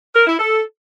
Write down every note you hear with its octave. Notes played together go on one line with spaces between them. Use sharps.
A#4
E4
A4